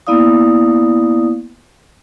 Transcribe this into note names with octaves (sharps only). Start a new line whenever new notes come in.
A#3 B3 E4 D5 F5 D#6